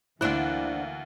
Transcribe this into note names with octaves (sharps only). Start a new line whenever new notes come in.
D2 E3 A#3 D4 E4 C5 F#5 F#6